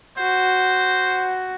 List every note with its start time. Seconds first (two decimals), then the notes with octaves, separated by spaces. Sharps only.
0.18 F#4 C5